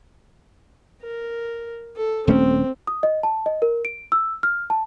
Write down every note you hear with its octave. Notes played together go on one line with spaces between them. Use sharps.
A#4
A4
D#1 A3 C4 C#4
D#6
D#5
A5
D#5
A#4
D7
E6
F6
A5